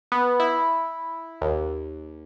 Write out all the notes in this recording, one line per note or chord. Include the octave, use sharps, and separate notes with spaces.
B3
E4
D#2